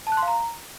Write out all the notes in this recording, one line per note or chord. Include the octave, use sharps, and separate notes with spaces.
A5
F#6
C6
F5
A#5